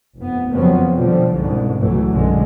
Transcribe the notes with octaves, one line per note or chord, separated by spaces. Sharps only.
F1 B3
F2 C#3 F3 F#3 B3 C4
B2 D3 F3 G3
C2 G#2 B2 D3
C#2 B2 E3 F#3 A3
B1 F#2 B2 D3 G#3